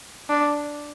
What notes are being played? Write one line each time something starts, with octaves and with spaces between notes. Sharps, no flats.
D4